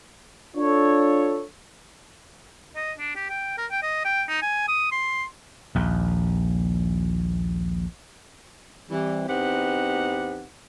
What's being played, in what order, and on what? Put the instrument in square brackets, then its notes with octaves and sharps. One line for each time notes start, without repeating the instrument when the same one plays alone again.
[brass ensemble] D4 F4 A4 C#5
[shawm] D#5
D4
G4
G5
A#4
G5
D#5
G5
D#4
G#5
D#6
C6
[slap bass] A#1 D#2
[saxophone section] E3 G3 C4
E2 C4 D#4 G4 B4 F#5